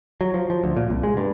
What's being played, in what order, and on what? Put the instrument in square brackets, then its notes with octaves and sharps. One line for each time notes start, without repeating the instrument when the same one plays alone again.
[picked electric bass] F#3
F3
F3
D2
A#2
C2
G#3
G2